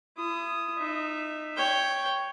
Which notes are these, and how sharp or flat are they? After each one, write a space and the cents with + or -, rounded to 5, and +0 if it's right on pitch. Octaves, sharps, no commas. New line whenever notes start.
E4 +35 D#6 +0
D#4 -20 E5 +0
C#5 +0 G5 +0